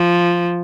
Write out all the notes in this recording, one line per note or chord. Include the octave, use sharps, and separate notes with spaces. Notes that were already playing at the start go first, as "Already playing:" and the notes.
Already playing: F3